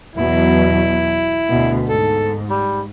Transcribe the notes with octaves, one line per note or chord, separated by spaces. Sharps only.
E2 B2 F#3 E4
D2 B2
G#2 A4
G3